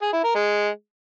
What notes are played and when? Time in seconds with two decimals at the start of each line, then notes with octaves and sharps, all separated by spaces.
0.02 G#4
0.13 E4
0.24 A#4
0.35 G#3